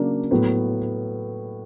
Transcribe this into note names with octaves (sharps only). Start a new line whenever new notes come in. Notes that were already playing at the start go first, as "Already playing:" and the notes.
Already playing: C#3 F#3 A#3 D4
A2 F#3 B3